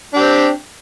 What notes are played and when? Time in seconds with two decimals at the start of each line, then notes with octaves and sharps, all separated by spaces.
0.14 D4
0.17 G4
0.19 C4